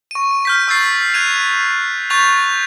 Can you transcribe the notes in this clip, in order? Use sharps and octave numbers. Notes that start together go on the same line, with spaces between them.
C#6 D#7
F6 G6 B6
C#6 E6 G6 A6 C7
F#6 G#6 D#7 F7
C#6 G6 A6 B6 F7